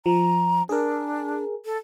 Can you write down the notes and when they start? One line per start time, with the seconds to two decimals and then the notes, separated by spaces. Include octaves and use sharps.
0.06 F3 A#5
0.69 D4 G#4 A#4
1.65 A4